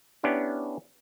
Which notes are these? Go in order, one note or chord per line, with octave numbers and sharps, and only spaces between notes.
B3 C#4 D4 E4 G4